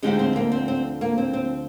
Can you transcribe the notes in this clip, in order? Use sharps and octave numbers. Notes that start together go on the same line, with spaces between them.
D2 D3 F3 G#3 D#4 G4
C4
A#3
C4
C4
A#3
C4
C4